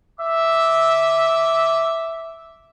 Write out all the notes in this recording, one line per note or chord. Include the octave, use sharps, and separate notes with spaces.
E5 D6